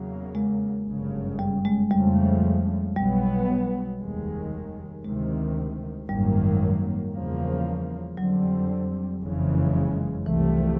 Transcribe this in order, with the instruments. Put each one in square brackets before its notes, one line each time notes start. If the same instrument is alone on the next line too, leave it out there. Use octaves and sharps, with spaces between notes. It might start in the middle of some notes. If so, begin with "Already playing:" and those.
Already playing: [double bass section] E2 C#3 F#3 A#3
[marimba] G#3
[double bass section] G1 F#2 C#3
[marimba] G3
G#3
[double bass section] F2 C#3 F3 A3 [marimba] G3
[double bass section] B1 B2 F#3 B3 [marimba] G3
[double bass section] F1 D#2 D#3 G#3
[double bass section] D2 C3 D#3 [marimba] G#3
[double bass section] G#1 F#2 D#3 F#3 A#3 [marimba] G3
[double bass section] E2 C#3 F3 A#3
[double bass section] F2 D3 G3 C4 [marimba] F#3
[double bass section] F#1 F2 C#3 E3 G#3
[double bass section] C2 C3 F3 A3 [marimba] E3